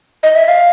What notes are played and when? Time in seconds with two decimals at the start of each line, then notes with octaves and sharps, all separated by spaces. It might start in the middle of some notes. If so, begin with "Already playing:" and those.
0.23 D#5
0.35 E5
0.48 F5